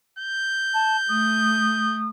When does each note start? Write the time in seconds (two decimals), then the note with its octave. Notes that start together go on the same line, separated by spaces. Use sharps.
0.19 G6
0.73 A5
1.09 A3 D#6